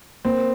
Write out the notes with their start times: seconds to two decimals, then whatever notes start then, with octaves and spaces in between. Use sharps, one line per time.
0.25 A#3 C4